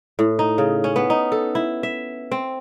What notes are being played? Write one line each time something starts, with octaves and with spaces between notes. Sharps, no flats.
A2
D#4
C#3
C#4
B3
D#4
A4
E4
E5
C4